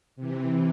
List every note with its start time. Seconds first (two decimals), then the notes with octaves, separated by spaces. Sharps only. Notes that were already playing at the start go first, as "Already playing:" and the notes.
0.16 C3 E3